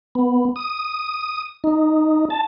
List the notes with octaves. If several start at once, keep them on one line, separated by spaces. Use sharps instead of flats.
B3
D#6
D#4
A5